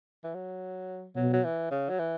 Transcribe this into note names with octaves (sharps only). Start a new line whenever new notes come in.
E3
F#3
B2 F#3
F#3
E3
C#3
F#3
E3